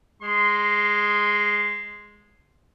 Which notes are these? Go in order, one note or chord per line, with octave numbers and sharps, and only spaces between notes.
G#3 C6